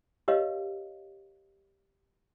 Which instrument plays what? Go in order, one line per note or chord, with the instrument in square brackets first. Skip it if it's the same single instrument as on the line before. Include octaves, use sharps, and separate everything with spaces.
[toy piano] G4 A#4 B4 C#5 D#5 F5